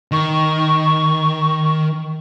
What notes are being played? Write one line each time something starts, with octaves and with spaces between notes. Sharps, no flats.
D#3 C#6